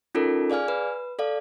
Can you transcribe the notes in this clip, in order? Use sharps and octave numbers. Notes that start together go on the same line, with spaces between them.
C#4 D#4 F4 A4 A#4
G#4 D5 F5 G#5 F6
B4
A4 D5 F5